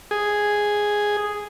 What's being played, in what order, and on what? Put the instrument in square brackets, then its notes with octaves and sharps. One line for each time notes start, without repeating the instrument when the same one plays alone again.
[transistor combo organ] G#4